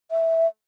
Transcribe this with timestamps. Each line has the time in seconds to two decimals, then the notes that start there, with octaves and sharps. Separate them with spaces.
0.11 E5